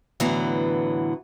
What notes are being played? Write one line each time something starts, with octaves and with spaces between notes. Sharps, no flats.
A2 D3 E3 F#3 B3